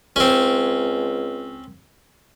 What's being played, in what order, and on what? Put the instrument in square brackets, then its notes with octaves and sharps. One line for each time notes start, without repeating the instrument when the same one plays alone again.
[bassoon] C#2 [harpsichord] C4 C#4